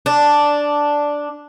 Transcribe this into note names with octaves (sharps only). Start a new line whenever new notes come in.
D4